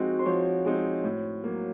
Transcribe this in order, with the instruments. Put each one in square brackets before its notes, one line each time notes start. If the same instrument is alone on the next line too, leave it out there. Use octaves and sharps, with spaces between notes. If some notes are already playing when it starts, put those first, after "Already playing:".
Already playing: [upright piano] F3 G#3 C4 D#4 [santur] F#4
[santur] C5
[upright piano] F3 [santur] C#5
[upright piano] G#3 C4 D#4
A2
F#3 A#3